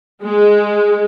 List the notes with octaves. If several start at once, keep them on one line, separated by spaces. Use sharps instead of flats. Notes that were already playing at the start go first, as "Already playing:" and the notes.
G#3